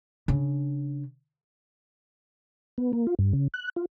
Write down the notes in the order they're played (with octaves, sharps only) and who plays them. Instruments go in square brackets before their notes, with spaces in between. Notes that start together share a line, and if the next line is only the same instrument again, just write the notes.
[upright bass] C#3 D4
[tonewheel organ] B3
A#3
F4
G2
C#3
F#6
F4